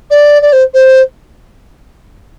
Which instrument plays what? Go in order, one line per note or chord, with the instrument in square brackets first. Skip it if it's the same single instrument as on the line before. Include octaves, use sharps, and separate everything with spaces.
[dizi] D5
D5
C5
C5